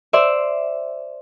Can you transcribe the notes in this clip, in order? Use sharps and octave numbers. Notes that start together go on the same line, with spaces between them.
C5 D5 E5